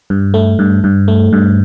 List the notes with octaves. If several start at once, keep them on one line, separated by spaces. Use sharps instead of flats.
G2
A3
G2
G2
A3
G2